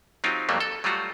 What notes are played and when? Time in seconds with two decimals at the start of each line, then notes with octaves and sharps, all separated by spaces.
0.24 F#3 C4 D#4 F4 G4
0.49 F2 F#3 G3 A3 A#3
0.60 A4
0.84 F#3 G3 A3 F4 F#4